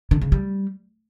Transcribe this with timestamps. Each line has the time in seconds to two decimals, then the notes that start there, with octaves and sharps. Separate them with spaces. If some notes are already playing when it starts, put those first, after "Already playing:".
0.11 D3
0.22 C#3
0.32 G3